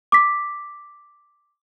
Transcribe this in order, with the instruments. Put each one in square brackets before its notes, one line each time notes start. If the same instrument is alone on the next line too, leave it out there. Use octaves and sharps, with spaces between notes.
[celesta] D6 B6